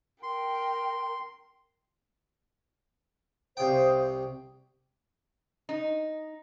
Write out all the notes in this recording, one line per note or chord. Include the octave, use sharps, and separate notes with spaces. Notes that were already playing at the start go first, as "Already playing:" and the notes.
A#4 G5 C6
C2 C5 F5 G5 D#6
D#4